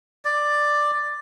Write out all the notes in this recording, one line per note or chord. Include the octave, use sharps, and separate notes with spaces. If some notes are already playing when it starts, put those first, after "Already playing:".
D5